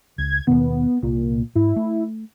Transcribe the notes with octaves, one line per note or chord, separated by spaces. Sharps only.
C#2 G#6
D#2 B2 D#3 B3
C2 A#2
G#2 E4
A3